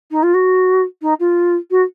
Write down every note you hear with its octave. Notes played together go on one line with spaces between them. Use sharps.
D#4
F4
F#4
D#4
F4
F#4